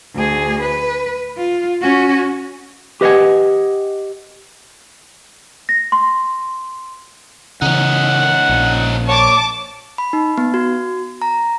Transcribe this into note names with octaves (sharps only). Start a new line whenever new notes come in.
D2 G#4
B4
F4
C#4 F#4
G4 B4 D#5 E5 F#5 G#5
A#6
C6
C#3 E3 C#4 D#4 F#5
A#1
C#5 A5 D6
B5
D#4
B3
F#4
A#5